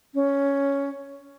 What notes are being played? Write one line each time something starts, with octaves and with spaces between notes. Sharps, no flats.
C#4